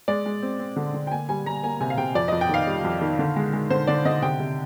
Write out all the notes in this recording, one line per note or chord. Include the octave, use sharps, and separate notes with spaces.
G#3 D5
G#3
C4
C4
D3
D3
G5
A#3 G#5
G3 G#5
G3 A#5
A#3 G#5
C3 G#5
F5
C3 G5
F2 D5
F2 D#5
G5
D#3 F5
G3
F2
D#3
D3
G#3
G#3
D3 C5
D3 D5
D3 D#5
C3 G5
C3